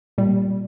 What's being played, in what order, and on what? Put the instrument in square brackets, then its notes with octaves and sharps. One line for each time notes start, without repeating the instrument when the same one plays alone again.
[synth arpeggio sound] A#2 G3